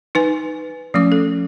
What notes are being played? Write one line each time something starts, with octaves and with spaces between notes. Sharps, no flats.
D#4 B4 G#5
F3 A3 C#4 D6
A4